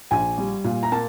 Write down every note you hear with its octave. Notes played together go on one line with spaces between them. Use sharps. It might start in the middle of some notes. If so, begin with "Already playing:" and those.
A#1 G#5
G3
A#2
A#5
A#3 A5